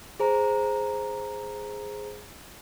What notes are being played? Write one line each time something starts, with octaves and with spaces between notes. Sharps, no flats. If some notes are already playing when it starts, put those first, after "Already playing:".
G#4 C5 A#5